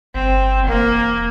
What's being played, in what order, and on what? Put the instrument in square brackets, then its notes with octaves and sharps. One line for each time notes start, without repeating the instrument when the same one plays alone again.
[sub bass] G1 [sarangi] C4
[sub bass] E1 [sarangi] A#3